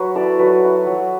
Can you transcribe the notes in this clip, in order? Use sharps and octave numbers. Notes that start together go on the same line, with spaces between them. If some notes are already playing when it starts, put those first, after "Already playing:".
Already playing: F#3 F#4 B4
E4 A4 D5
F#3 F#4 B4
E4
F#3